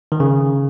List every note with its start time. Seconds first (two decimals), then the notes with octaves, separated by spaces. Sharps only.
0.12 D#3
0.20 C#3